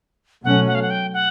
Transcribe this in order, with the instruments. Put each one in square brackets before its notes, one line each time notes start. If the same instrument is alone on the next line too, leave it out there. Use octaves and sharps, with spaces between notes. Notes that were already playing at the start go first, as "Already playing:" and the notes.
[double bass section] B2 F#3 A3 C#4 [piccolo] F#5
[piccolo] F#5
F5
F#5
G5
F#5